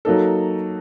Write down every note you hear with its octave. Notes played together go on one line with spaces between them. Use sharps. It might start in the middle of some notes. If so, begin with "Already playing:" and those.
F#3 A#3 D#4 A4